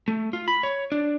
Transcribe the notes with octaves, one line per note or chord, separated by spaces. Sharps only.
A3
F4
B5
C#5
D4